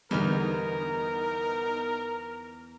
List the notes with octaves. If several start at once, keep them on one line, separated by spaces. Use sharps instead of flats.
E2 D3 G3 B3 D#4 A#4 F6